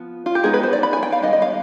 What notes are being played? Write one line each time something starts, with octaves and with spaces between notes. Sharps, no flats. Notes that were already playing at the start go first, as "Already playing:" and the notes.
Already playing: F3 B3
F4
G4
G#3 B3 D#4 G#4
B4
C5
D5
B5
G#5
G5
F5
D#3 G3 B3 D#5
D#5
F5